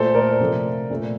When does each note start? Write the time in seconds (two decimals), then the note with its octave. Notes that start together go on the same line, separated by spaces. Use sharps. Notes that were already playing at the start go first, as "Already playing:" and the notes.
Already playing: A#2 A3 A4 C5
0.15 A#4 D5
0.40 C3 F3 A3
0.90 A#2 A3